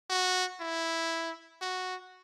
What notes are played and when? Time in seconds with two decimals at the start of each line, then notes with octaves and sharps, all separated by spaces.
0.10 F#4
0.60 E4
1.61 F#4